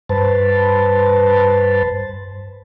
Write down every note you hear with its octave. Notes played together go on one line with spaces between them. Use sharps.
G2 B4 C5 A5